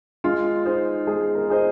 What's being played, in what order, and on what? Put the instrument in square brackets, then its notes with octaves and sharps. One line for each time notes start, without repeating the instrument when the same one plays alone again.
[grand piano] G#3 [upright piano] F4
[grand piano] D#4 G#4 C5 D#5
[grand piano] G#3 [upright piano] G#4
[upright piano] A#4
[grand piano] D#4 G#4 C5 D#5